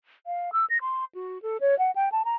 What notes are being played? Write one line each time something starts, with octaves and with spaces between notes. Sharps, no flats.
F5
E6
A#6
C6
F#4
A4
C#5
F#5
G5
A5
A#5